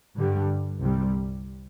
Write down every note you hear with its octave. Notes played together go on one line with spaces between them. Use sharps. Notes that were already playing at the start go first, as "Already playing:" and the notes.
G2 D3 G3
C2 C3 G3